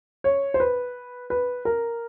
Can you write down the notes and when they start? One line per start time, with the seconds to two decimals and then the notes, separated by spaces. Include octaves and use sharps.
0.24 C#5
0.54 C5
0.60 B4
1.30 B4
1.65 A#4